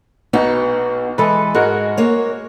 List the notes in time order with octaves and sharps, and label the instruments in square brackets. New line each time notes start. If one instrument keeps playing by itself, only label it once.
[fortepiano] B1 [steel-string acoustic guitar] B3 D#4 F#4
[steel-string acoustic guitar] E3 G#3 [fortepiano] A4 B4
[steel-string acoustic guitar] G#2 [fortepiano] G#3 F#4 A#4
[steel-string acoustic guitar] A#3 C#5